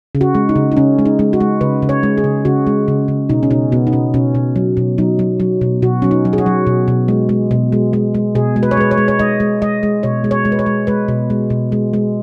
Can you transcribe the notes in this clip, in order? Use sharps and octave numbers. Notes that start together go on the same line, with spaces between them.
C#3
F#4
G#3
D#4
C#3
D#4
C#3 C#4
G#3
D#4
G#3
F#4
G#3
C#3 B4
C#3
C#5
G#3
G#4
C#3
C#3 F#4
G#3
C#3
C#3
B2 D#4
C#4
B2 D#4
B2 B3
D#4
B2 C#4
B2 C#4
B2
F#3
B2
F#3 D#4
F#3
F#3
B2
B2 F#4
F#3 C#4
D#4
F#3
G#4
F#4
F#3
B2
B2
G#3
G#3
B2
G#3
G#3
G#3
B2 G#4
G#3
B4
C#5
G#3 B4
C#5
G#3
C#5
G#3 D#5
G#3
G#3 D#5
G#3
B2 C#5
G#3
C#5
G#3
B4
C#5
G#3
G#3 B4
B2
G#3
B2
G#3
G#3